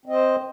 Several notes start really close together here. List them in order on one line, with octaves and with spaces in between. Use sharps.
C4 D#5 C5